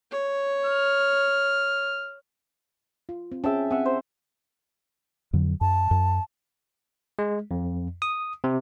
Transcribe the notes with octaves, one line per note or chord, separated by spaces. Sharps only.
C#5
F6
F4
C4
C#4 G#4 E5 G5 A5
C4 E5 F#5 G#5
C5
F2 D3 F#3
F#2 A5
F#2
G#3
F2
D#6
C3